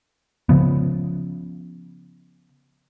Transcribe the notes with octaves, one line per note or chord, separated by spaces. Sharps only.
C#3 F3 B3